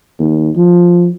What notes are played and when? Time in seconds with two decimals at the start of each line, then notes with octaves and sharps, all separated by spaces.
0.20 D#2
0.56 F3